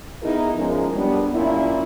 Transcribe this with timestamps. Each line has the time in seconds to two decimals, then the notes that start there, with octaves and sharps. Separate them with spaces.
0.22 B3 D#4 E4 G#4 A#4
0.57 F3 G#3 C#4 A#4
0.96 G3 B3 D4
1.34 F#2 A#2 C#4 E4